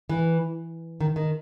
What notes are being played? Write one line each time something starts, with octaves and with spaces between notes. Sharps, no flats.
E3
D#3
D#3